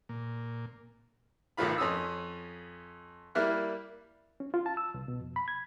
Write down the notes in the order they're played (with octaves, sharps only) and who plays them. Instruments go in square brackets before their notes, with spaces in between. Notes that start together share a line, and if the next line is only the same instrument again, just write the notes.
[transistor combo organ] A#2
[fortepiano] B1 A2 D#3 F#3 F4 B5
F2 C#4 D#6 E6
G3 A#3 E4 F6 F#6
[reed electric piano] C#4
F4
A5
E6
C2
B2
F2
B5
G#6